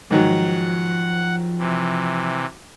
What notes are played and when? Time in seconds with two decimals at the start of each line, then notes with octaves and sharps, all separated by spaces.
0.11 G#2 D#3 F3 F#3 F#5
1.58 C3 E3